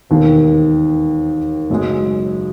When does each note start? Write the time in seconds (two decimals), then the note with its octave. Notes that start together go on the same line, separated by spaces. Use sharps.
0.10 E1 D#2 D#3
1.70 F#1 F#2 C#3 G#3